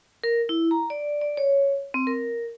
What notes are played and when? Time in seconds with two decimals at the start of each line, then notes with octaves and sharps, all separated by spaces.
0.24 A#4
0.49 E4
0.71 A#5
0.90 D5
1.21 D5
1.37 C#5
1.94 C4
2.07 A#4